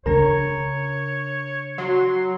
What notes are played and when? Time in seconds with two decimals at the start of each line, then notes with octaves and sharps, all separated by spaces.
0.06 C#3 D4 A#4 C#5 A#5
1.78 F#3 C6